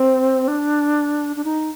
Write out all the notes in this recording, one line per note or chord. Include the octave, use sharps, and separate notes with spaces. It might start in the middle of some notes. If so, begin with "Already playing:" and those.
Already playing: C4
D4
D4
D#4